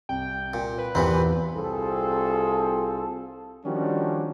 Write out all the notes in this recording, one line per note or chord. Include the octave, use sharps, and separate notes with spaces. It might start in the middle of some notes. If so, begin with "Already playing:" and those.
C2 G5
A#2
B4
E2 A#2 E3 C4 G4 B5
C2 C4 F4 G#4 A4
D#3 F3 G3 C#4 D4 F#4